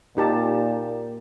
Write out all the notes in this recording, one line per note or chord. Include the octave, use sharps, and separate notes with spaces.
A#2 D#4 G4 A5